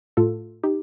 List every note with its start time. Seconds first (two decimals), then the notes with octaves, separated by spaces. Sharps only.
0.17 A2 A3 F4 A4
0.63 D#4 G4